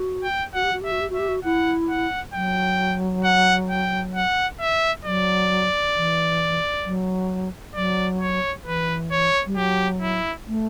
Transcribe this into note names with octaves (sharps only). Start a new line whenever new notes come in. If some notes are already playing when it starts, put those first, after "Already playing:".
Already playing: F#4
G5
F#4 F#5
G4
F#4
G4 E5
F#4
G4
F#4 E5
G4
F#4
E4 F#5
F#5
F#3 G5
F#5
G5
F#5
E5
F#3 D5
E3
F#3
F#3 D5
C#5
E3 B4
C#5
G3
F#3 G4
E4
A3